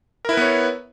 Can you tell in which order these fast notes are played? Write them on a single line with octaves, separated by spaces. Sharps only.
A#4 E4 B4 B3 C#5